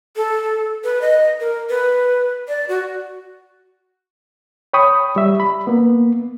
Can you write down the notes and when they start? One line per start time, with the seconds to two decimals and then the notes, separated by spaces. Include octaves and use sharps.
0.16 A4
0.84 B4
1.02 D#5
1.40 A#4
1.70 B4
2.48 D5
2.69 F#4
4.73 C#5 G5 B5 C#6 D#6
5.16 G3 E5
5.40 B5
5.67 A#3 B3